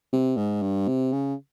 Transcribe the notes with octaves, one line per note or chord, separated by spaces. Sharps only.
C3
G#2
G2
C3
C#3